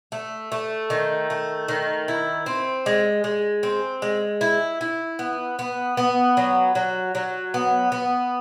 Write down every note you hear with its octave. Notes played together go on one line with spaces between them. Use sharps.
A3
A3
D#3
A3
D#3
E4
C4
G#3
G#3
C4
G#3
E4
E4
B3
B3
B3
F#3
F#3
F#3
B3
B3